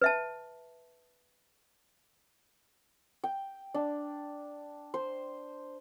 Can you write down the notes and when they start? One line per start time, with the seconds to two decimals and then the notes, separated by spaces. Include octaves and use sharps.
0.02 B4 E5 A5
3.24 G5
3.74 D4
4.94 C5